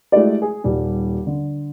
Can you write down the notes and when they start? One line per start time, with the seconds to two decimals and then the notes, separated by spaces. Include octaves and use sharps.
0.12 G#3 A3 E4 F#4 G4 D5
0.42 G#4
0.64 D#1 G3
1.27 D3